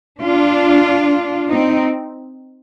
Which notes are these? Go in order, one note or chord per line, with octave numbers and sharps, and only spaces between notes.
D4 F4
C4 D#4